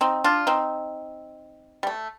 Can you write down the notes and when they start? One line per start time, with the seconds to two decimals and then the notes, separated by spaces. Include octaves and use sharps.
0.01 C4 D#4
0.24 D4 F4
0.47 C4 D#4
1.83 G3
1.87 A3